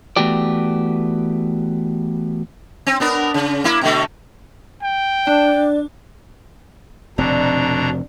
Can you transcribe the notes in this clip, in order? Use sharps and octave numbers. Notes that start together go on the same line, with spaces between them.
E3 A3 B3 F#4 G4 D5
C4
B3 D4 A#4
C#3
A#3 E4
B2 D3 A3
G5
D4 D5
F1 B2 D3 C4 D4 A#5